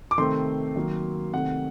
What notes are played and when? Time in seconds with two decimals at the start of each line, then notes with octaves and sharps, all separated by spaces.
0.11 D6
0.18 C3 D#3 A3 C4 C6
0.76 D#3 F#3 A#3
1.33 C3 D#3 A3 C4 F#5